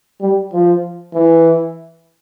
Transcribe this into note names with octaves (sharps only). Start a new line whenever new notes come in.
G3
F3
E3